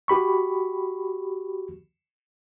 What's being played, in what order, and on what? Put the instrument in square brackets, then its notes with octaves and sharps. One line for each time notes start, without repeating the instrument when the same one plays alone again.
[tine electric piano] F#4 G4 B5 C#6